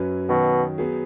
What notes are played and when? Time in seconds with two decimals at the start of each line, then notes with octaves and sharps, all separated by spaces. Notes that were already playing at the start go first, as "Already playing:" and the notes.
Already playing: F#2 F#3 C#4 B4
0.29 B2 D#3 F#3 C#4
0.78 F#3 B3 G#4